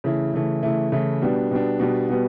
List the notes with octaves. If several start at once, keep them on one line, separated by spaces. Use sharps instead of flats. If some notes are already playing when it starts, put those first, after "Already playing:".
C#3 E3 A3 E4
C#3 E3 A3 E4
C#3 E3 A3 E4
C#3 E3 A3 E4
B2 G3 B3 D4
B2 G3 B3 D4
B2 G3 B3 D4
B2 G3 B3